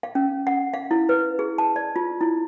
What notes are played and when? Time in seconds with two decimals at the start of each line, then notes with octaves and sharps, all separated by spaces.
0.03 F5
0.15 C#4
0.47 F#5
0.74 F5
0.91 E4
1.09 B4
1.39 G#4
1.58 A5
1.76 D5
1.96 F4
2.21 E4